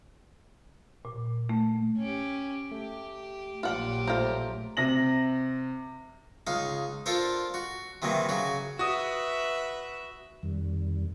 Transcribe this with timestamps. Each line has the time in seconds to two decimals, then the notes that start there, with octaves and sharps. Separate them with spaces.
1.05 A#2
1.49 A3
1.97 C#4 G4
2.71 A3 G4
3.63 A#1 A#2 F#3 F4 G4 D5 F#5
4.07 A3 F4 C5 A#5
4.77 C3 A#6 F#7
6.47 C#2 D#4 F5
7.06 D4 F4 A4 A#4 C5
7.54 F#4
8.02 C3 D#3 E3 F#3 A#3
8.29 C#3 F#3 F#4
8.79 F#4 B4 E5 D#6
10.43 F2 D#3 G3